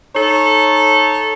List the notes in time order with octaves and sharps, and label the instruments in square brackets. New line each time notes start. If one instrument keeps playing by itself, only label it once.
[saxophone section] D#4 A4 C#5